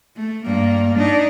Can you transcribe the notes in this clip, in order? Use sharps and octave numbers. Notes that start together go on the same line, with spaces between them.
A3
G2 A#3
D4 D#4